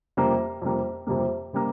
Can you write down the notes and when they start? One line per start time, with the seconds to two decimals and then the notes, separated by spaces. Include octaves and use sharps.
0.17 F2 C3 G3 A#3
0.62 F2 C3 G3 A#3
1.07 F2 C3 G3 A#3
1.53 C3 G3 A#3